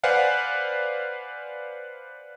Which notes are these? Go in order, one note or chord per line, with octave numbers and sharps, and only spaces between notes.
B4 C5 D5 F5 F#5 G#5